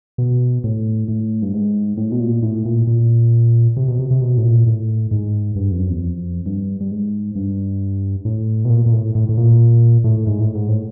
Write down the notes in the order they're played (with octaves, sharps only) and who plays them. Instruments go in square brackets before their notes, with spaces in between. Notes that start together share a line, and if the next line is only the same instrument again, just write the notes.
[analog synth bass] B2
A2
A2
G2
G#2
A2
B2
A#2
A2
A#2
A#2
C3
B2
C3
C3
B2
A2
A#2
A2
G#2
G2
F2
F#2
E2
F2
G2
G2
G#2
G2
A2
B2
A#2
A#2
A2
A2
A2
A#2
A2
G#2
A2
G#2
A2